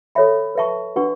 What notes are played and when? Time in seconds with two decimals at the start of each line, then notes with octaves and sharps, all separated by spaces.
0.15 A4 C#5 E5 B5
0.55 B4 E5 A5 C#6
0.96 D4 F#4 B4 F#5 C#6